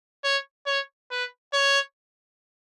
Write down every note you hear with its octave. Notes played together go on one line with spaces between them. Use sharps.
C#5
C#5
B4
C#5